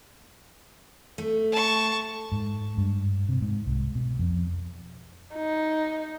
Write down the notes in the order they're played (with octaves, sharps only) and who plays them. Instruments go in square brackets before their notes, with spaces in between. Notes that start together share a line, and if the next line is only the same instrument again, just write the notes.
[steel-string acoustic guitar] A3
[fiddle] A5 C#6
[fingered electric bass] G#2
G2
C3
G#2
C2
B2
F2
[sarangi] D#4